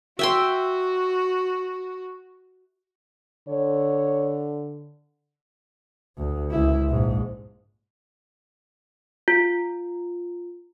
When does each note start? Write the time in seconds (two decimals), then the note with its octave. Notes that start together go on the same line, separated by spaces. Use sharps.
0.19 F#4 E5 G5 C6
3.48 D3 C#5
6.17 D2
6.51 C#2 E4
6.89 A#1 G#2
9.28 F4